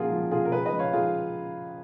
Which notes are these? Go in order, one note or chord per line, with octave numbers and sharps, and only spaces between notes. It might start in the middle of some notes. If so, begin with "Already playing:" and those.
Already playing: A#2 C#3 F3 F4 F#4 G#4 A#4
F3
C#3 F4 G#4
A#4
C#3 G#4 B4
B4 D#5
F3
C#5 F5
F3 F4 G#4